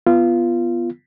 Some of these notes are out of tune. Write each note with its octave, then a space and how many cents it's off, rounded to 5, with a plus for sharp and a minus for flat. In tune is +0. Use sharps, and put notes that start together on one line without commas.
B3 +0 F4 -20